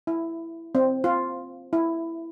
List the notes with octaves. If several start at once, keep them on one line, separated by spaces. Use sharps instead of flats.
E4
C4
F4
E4